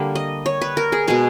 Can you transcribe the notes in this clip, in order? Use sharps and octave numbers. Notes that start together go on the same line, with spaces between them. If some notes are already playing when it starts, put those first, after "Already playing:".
Already playing: D3 G3 A#3
D#5
C#5
B4
A#4
G#4
B2 G#3 B3 G#4